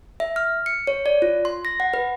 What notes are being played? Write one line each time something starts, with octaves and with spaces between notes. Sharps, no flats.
E5
F6
C#7
C#5
D5
F4
C6
A#6
F#5
B4